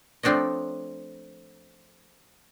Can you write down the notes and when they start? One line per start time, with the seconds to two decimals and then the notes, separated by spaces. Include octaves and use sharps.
0.23 F3 A3 C4 D4 C#5 D#5